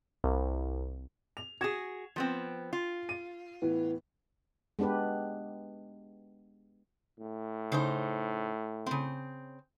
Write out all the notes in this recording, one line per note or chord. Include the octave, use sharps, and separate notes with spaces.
C2
F7
F#4 G#4 G#6 E7
F3 B3 C4
F4
D#7
A2 E3 B3
G#3 B3 D4 G4 B4
A2
C#3 D#4 C5
C#3 C4